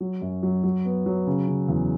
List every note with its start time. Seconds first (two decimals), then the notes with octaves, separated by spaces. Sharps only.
0.01 F#3
0.22 F#2
0.43 F#3
0.63 F#3
0.85 B3
1.06 F#3
1.27 C#3
1.48 C#3
1.68 E2